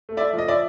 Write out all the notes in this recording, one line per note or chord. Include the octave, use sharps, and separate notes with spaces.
A3
D5 E5
F3
D#5
D5 E5